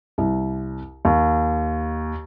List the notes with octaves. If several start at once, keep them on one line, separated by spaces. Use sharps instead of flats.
C2
D#2